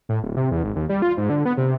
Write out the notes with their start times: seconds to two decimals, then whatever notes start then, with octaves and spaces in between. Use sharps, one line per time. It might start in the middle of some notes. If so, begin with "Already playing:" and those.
0.09 A2
0.23 D1
0.37 C3
0.51 E2
0.64 G#1
0.76 D#2
0.89 G3
1.02 F4
1.17 G#2
1.30 D3
1.45 B3
1.57 C3